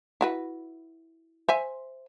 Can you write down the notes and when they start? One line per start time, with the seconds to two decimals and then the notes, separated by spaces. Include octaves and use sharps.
0.21 E4 F#4 B4
1.49 C5 E5 G#5